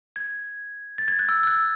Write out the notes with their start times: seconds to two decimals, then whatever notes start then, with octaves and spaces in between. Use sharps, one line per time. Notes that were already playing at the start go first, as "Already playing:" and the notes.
0.16 G#6
0.98 A6
1.08 G#6
1.19 F#6
1.29 E6
1.43 E6
1.47 F#6